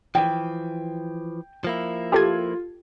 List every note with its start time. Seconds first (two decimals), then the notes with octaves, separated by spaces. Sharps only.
0.15 E3 F3 G5
1.64 F3 A#3 E4
2.12 F4 G4 A4 G#6